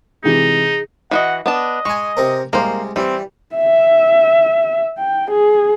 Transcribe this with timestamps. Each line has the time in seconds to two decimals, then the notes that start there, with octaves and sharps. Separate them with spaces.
0.24 C3 E3 G#3 D#4 G#4
1.11 E3 F#4 D#5 F#5
1.46 B3 D4 D#5 A5
1.85 G#3 G#5 C#6
2.17 C3 C4 A#4
2.53 C2 G#3 A#3 C5
2.96 E3 G3 C4
3.55 E5
4.98 G5
5.30 G#4